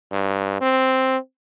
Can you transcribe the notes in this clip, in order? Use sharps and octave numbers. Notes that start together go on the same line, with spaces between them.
G2
C4